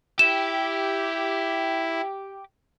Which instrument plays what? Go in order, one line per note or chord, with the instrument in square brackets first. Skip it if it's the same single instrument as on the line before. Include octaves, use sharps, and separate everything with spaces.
[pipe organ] E4 [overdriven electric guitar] G4 [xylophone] E7